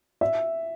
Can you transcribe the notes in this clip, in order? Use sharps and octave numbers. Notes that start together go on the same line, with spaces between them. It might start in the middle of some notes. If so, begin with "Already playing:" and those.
E5